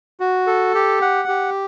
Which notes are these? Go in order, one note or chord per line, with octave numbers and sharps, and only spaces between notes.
F#4
A4
G4
F#5
G4